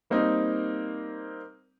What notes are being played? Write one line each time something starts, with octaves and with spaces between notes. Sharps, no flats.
G3 A#3 C4 D#4